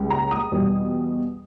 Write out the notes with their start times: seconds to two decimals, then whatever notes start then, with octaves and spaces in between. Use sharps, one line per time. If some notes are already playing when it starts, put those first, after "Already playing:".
Already playing: C#2 C#3 G3
0.10 A#5
0.31 D#6
0.52 E2 B2 G3